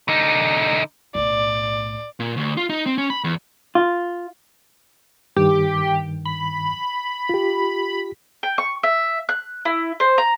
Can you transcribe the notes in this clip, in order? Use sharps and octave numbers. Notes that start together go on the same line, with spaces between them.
D3 D#4
B1 A2 D5
A#2
D2
F4
D#4
C4
C#4
B5
E2
F4
G2 D#3 G4
B5
F4 G4
G5
C#6
E5
F#6
E4
C5
A#5